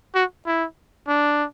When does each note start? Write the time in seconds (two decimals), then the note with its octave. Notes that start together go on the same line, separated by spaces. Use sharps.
0.15 F#4
0.47 E4
1.08 D4